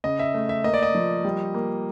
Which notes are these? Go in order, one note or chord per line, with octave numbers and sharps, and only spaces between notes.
C#3 D#5
E5
A3
E5
A#3 D#5
D5
D#5
F3
G3
A#3